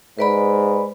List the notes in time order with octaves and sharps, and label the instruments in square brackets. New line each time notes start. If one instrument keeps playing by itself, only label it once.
[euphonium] G#2 [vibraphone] B4 D5 B5